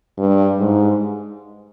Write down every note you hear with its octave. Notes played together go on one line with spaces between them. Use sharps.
G2
G#2